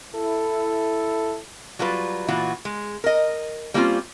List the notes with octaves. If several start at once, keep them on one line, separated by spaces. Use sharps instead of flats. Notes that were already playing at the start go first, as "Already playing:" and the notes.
E4 A4
F#3 G3 F4 B4
A#2 E3 F4 F#4
G#3
A#4 D#5
G3 A#3 C4 C#4 D#4 F4